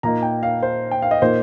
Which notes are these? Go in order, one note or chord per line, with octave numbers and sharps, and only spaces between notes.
A#2 A#3 D#4 A#5
G5
F5
C5
G5
F5
D#5
A#2 A#3 D#4 C5